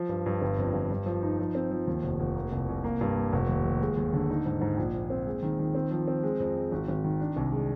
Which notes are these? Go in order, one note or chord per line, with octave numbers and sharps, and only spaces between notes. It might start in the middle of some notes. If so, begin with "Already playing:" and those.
Already playing: F3
G2
G2
G1
F2
G1
G2
F3
D#4
F3
C4
F3
D#2
F1
F1
A#3
C2
C2
A#3
G2
A#3
F1
D#2
D#2
G#3
D#2
D3
D#4
G#2
G#2
A#1
A#2
C4
G#3
D#3
D#3
C4
F3
C4
G#3
F2
G#3
G#1
G#1
D#3
D4
C2
G#3